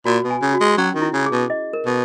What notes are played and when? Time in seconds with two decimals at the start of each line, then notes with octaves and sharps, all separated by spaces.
0.05 A#2 F#4
0.24 B2
0.31 G#5
0.42 C#3
0.54 F#4
0.61 G#3
0.77 F#3 C#4
0.95 D#3
1.02 E4
1.13 C#3
1.26 G#4
1.32 B2
1.50 D#5
1.73 A#4
1.86 B2